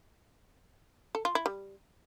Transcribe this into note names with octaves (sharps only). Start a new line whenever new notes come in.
A4
F4
E4
G3